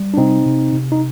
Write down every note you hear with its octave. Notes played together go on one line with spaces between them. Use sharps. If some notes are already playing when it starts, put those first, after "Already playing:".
Already playing: G3
D4
C3 C4 D#4
C3
C3
D#4